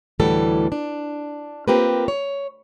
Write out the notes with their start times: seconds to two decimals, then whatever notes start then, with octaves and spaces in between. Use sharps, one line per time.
0.20 D2 A2 E3 G3 A4
0.72 D4
1.68 A#3 C4 F4 G4 A#4 B4
2.08 C#5